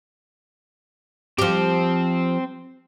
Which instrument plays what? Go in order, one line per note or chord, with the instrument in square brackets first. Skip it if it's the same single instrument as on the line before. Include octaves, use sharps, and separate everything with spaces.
[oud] F3 G4 [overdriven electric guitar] C4